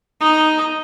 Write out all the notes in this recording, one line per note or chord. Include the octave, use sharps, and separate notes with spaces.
D#4 D#5